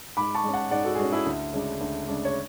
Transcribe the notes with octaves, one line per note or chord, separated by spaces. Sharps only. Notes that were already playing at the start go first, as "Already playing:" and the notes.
G#2 B5 D6
A5 C#6
G#3 C#4
F#5 A5
G#2 D5 F#5
F#4 A4
G#4
G#3 C#4 F#4
E4 G#4
D2
C#3 G#3 D4
D2
C#3 G#3 D4
C#5